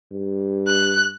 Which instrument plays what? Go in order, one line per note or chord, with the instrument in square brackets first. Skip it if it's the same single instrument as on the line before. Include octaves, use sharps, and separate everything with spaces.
[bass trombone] G2
[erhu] F#6